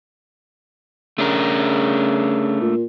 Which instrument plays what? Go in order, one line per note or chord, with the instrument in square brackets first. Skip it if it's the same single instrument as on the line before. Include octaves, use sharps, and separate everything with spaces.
[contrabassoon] C#3 [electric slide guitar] A3 D4 A#4
[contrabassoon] A#2